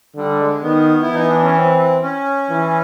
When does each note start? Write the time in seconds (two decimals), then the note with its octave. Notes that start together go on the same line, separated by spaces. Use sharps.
0.16 D3 G3
0.40 G#3
0.63 D#3 B3
1.02 E4
1.09 E3
1.15 D#4
1.29 D4
1.42 C#4
1.56 C4
2.03 C#4
2.50 E3